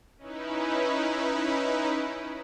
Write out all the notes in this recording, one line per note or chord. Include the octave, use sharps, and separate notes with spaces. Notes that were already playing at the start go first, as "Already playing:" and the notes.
C#4 D#4 E4 B4